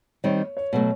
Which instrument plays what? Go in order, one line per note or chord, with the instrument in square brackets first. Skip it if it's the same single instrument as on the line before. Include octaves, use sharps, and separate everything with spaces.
[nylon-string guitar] D#3 G3 C4 D#4 [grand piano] C#5
[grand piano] C#5
[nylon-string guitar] B2 F#3 A3 [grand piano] C#5